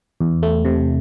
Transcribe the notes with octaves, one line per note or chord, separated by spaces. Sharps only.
E2
A3
C3